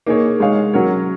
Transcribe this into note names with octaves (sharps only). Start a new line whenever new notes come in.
A#3 D#4 G#4 C#5
G#3 D#4 G#4 C#5 F5
F#3 C#4 F#4 A#4 C#5